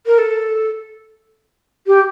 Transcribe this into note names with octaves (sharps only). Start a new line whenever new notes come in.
A#4
A4
G4